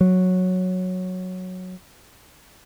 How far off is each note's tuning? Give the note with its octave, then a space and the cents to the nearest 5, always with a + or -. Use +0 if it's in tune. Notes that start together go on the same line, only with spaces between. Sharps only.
F#3 -10